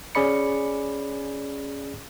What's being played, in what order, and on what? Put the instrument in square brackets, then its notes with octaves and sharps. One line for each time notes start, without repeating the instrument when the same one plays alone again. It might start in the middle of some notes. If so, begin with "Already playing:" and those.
[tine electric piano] C#4 G#4 D5 B5 C#7